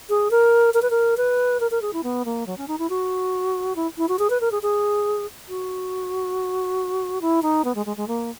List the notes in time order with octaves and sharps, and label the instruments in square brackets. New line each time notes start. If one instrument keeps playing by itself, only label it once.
[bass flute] G#4
A#4
A#4
B4
A#4
B4
A#4
A#4
G#4
E4
B3
A#3
F#3
C#4
D#4
E4
F#4
E4
E4
F#4
G#4
B4
A#4
G#4
G#4
F#4
E4
D#4
B3
G#3
G#3
G#3
A#3